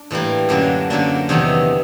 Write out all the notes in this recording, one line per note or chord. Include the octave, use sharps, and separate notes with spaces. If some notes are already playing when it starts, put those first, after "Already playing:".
Already playing: D4
A2 E3 G3 A#3
F#2 D3 F#3 A#3 D4
F#2 D3 F#3 A#3 D4
E2 C3 D#3 F#3 B3